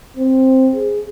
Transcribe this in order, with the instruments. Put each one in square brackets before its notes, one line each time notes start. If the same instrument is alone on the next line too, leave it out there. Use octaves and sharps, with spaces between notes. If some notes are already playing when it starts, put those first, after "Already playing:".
[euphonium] C4
G#4